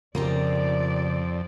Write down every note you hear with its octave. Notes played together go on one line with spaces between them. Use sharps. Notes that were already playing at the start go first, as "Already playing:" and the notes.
F2 C#3 A#3 F4 G4 D5